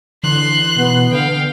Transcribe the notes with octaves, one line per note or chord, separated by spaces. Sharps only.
D3 E3 C6 F#6
B2 B3
D3 F5 G5